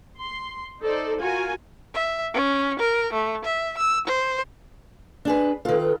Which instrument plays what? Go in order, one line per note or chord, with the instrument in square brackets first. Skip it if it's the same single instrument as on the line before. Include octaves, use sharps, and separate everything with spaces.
[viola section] C6
D#4 A4 C5 D5
F4 F#4 A#4 G#5
[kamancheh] E5
C#4
A#4
A3
E5
E6
C5
[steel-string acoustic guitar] D4 G#4 B4
[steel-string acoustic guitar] D#3 F4 [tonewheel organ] A4 B4